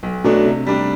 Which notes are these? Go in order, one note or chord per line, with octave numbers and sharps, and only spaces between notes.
B1
B2 F#3 A3 D4
C3
G3 D4